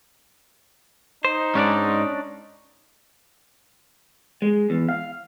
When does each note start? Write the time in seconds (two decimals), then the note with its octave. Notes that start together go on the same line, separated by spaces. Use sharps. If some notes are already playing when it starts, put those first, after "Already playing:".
1.25 D#4 C5
1.55 G#2 C#4 D4 D5
4.42 G#3
4.70 E2
4.89 F5